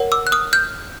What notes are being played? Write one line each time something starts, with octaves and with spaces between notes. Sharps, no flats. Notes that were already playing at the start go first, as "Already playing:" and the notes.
Already playing: A#4 C#5 F#5
D6 E6
F#6
D#6 F6
F6 G6